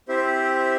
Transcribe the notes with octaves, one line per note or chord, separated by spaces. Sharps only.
C4 E4 G4 C5 E5